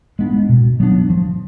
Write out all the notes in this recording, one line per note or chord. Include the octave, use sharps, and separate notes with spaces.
G#3 B3 D4
B2
F#3 B3 D4
F3